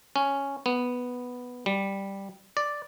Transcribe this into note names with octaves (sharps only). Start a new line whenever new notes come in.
C#4
B3
G3
D5